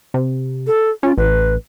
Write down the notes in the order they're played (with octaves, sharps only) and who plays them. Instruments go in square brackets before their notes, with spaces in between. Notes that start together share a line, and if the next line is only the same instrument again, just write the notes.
[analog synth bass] C3
[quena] A4
[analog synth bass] C#4 [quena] F4
[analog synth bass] A1 [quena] B4